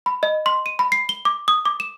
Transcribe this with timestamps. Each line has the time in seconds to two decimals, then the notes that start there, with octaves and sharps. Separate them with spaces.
0.06 B5
0.23 D#5
0.46 C6
0.66 D#7
0.79 B5
0.92 C7
1.09 G7
1.25 D6
1.48 D#6
1.65 D6
1.80 E7